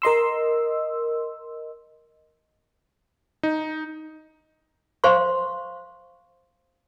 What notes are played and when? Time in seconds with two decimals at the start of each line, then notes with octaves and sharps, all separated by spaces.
0.02 A#4 D#5 C6 E6
3.43 D#4
5.04 C5 F5 C6 C#6